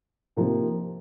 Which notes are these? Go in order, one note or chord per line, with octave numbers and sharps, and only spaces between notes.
C3 F3 A#3 D#4 C5